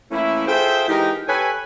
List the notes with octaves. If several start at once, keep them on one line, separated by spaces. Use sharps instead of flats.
E3 A3 A#3 C#4 E4
F4 G#4 A4 C5 E5 G5
E3 G#3 D#4 G4 A#4 D#5
G4 A4 B4 C#5 G#5